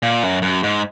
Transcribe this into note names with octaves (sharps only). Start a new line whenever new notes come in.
A#2
F#2
F#2
G#2